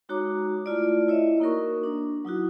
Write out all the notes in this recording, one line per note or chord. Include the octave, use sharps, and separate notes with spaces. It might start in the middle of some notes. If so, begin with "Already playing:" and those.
G#3 D#4 F#4 C#5 A#5 D6
A3 E4 F4 D5
E4 C#5 D#5 E5
A#3 D#4 F#4 A#4 C#6
D4
F#3 D#4 E4 F#4